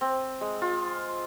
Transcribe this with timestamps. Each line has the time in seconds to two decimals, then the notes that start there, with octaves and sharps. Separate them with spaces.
0.01 C4
0.41 G#3
0.62 F4